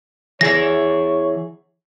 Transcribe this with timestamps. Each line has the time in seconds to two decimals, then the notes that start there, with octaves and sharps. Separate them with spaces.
0.41 E3 G#4 C#5 A#6